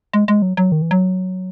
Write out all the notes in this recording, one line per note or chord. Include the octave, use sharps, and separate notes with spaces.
G#3
G#3
F#3
F#3
D#3
E3
F#3